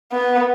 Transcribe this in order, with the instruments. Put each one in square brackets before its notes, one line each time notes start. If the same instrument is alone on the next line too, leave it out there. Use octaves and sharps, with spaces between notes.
[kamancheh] B3